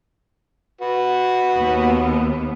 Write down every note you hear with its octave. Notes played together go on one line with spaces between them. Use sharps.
F#4 B4
D#2 B3